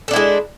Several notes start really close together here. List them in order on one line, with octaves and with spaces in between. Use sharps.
A4 D4 E4 G#3